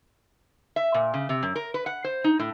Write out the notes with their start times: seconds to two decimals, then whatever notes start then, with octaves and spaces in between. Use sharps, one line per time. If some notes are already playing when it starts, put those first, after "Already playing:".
0.76 E5
0.94 A#2
1.14 C#3
1.29 C3
1.43 F#2
1.56 A#4
1.74 B4
1.86 F#5
2.04 C5
2.24 D#4
2.39 A2